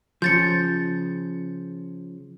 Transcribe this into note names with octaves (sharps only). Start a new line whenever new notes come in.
C#3 F3 G6 A6 C#7